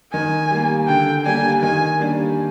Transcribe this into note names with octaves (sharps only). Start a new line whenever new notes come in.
D#3 G#5
G3 A#3
D3 G5
G3 A#3 D4 G#5
D#3 G#5
G3 A#3 D4